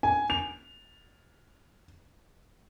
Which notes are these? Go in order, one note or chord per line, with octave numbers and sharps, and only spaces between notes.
G#5
F7